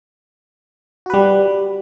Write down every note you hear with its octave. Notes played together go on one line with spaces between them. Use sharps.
G3 F#4 B4